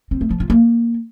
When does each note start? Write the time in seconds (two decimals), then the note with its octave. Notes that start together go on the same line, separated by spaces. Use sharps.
0.11 C4
0.21 A3
0.30 F3
0.40 F4
0.50 A#3